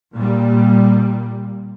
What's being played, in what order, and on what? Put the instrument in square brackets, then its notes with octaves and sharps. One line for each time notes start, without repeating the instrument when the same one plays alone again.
[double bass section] A#2 G3